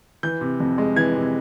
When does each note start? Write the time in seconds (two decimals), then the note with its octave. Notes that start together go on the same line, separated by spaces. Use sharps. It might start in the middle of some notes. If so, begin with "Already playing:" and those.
0.23 E3 G6
0.41 C3
0.60 F2
0.78 G#3
0.96 E3 G#6
1.15 C3